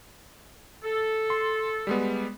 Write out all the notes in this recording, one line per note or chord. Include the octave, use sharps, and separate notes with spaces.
A4
C6
G3 G#3 B3